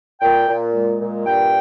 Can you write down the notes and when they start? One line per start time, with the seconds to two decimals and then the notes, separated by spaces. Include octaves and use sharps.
0.21 A#2 G5
0.47 A#2
0.73 G#3
0.99 A#2
1.25 G2 G5